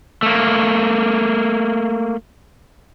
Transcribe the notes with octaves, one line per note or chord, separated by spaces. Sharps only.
A3 A#3